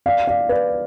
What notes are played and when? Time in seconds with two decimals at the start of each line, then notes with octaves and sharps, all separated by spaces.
0.06 D5 F5
0.27 D5 F5
0.49 B4 D5